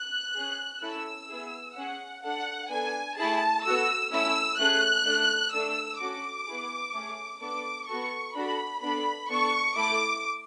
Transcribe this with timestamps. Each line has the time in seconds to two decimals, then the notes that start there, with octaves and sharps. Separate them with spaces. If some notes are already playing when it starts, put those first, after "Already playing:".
Already playing: F#6
0.35 C#4 G#4
0.82 A3 C#4 E4 A4 E6
1.28 B3 E4 G#4
1.76 C#4 G#4 F#5
2.23 D4 A4 F#5
2.70 B3 D4 A4 G#5
3.17 A3 E4 G#4 A5
3.64 B3 F#4 A4 E6
4.11 A3 C#4 E4 E6
4.58 A3 C#4 G#4 F#6
5.05 A3 D4 A4
5.52 A3 D4 A4 E6
5.99 C#4 F#4 A4 D6
6.47 B3 E4 G#4
6.94 A3 C#4 G#4
7.41 B3 D4 A4 D6
7.87 B3 F#4 A4 C#6
8.34 D4 F#4 A4 B5
8.82 B3 D4 A4 B5
9.29 B3 D4 A4 C#6
9.76 A3 E4 A4 D6